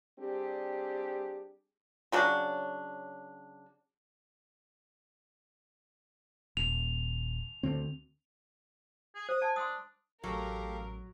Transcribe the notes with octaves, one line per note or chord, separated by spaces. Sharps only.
G3 C4 D4 G4 G#4
C#3 F#3 D4
D#1 F7
D2 D3 C4
G#4
C5 D#6
G#5 A5
D4 C6 D#6
A1 F#3 G4 A4 A#4 F5